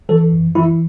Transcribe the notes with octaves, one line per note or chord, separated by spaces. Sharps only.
E3 A4
F#2
E3 E4